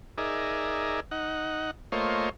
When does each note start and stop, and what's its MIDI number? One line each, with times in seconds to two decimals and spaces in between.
0.18 1.00 63
0.18 1.00 68
0.18 1.00 70
0.18 1.00 74
0.18 1.00 76
1.11 1.71 63
1.11 1.71 78
1.92 2.29 57
1.92 2.29 58
1.92 2.29 65
1.92 2.29 72
1.92 2.29 73
1.92 2.29 75